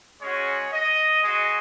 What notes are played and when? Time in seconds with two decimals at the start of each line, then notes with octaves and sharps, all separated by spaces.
0.20 G#3 C#4 F#4 C#5
0.72 D#5
1.24 G#3 F#4 D#5